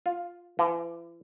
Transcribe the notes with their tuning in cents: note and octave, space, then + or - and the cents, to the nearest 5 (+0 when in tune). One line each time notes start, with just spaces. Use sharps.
F4 +5
E3 +40